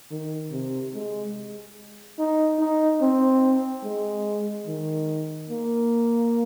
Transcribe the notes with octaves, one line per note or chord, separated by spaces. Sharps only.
D#3
C3
G#3
D#4
D#4
C4
G#3
D#3
A#3